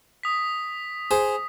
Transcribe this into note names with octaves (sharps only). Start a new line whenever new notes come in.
D#6 B6
G#4 C5